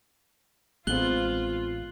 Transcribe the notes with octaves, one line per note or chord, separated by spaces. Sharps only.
A1 G#3 B3 C4 F4 F#6 F#7 G7